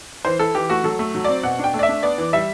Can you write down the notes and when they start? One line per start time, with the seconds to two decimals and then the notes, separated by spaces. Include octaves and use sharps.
0.25 E3 C5
0.39 E4 A4
0.55 E3 G4
0.69 A3 F#4
0.84 F#3 A4
0.99 A3
1.15 F#3
1.24 C4 D5
1.43 B2 F#5
1.59 D4 G5
1.74 A3
1.79 D5
1.83 E5
1.89 D4
2.03 B3 D5
2.18 E3
2.33 G3 E5